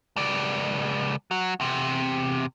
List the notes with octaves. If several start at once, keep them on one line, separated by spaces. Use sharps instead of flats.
C#2 D5
F#3
E2 C3